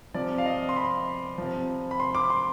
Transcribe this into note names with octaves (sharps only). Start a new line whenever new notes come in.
C3 F3 D5
F5
D#5
C6
B5
C3 F3
B5
C6
D6
C6